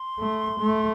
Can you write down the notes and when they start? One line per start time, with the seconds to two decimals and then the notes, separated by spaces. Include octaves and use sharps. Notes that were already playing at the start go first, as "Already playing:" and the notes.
Already playing: C6
0.19 A3
0.60 A3